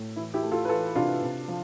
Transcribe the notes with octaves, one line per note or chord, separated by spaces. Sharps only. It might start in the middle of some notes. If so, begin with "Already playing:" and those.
Already playing: A2
E3 E4
E4 G4
A3
F4 A4
B4
E3 F4 A4
C3 D4 F4
C3
F3